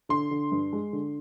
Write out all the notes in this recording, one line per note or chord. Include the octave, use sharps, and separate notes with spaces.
D3 C6
D3
G2
G#3
D3